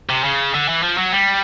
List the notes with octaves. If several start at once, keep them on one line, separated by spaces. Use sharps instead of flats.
C3
C#3
D3
E3
F3
F#3
G3